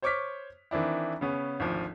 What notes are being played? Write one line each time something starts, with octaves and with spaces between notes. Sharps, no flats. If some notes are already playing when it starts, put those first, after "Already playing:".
C5 C#5 C#6 D6 F6 B6
D#3 E3 C4 D4 E4
C#3 B3 C#4
G#1 D2 F3